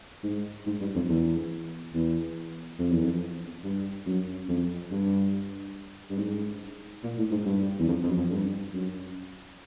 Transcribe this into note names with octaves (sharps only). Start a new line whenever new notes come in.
G#2
G#2
G2
F2
E2
E2
F2
E2
F2
G2
F#2
F2
G2
G2
G#2
A#2
A2
G#2
G2
E2
F2
F2
F#2
F2
G2
F#2